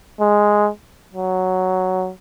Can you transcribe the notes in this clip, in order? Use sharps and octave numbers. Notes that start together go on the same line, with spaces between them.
G#3
F#3